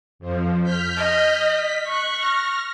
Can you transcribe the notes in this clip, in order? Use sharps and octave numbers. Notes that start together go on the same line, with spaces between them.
F2 F3
F6 G6 B6
D#5
B6
C#6 F#6
F6 A#6